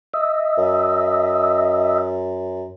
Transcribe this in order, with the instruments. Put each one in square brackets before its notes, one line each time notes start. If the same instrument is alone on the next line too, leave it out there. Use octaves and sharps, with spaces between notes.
[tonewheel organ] D#5 E5
[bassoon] F#2